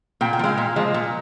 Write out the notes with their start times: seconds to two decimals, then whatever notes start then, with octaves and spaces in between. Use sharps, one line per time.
0.21 A#2 G5
0.33 G5
0.39 F3
0.44 G#3 F5
0.58 A#2
0.76 F3 G#3
0.94 A#2